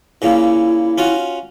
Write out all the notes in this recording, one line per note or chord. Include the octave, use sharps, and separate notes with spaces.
A#2 C#3 A#3 E4
C#4 F4 F#4